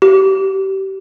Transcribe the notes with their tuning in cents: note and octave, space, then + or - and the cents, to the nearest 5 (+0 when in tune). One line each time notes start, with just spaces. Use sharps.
G4 -30